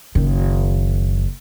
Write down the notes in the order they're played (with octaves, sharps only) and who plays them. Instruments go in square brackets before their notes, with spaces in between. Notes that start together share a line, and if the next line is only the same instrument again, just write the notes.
[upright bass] F#1 D#3